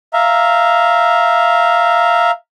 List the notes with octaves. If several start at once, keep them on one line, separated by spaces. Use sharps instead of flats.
E5 F5 A#5